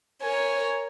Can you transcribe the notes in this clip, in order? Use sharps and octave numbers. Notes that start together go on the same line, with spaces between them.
A#4 C#5 G#5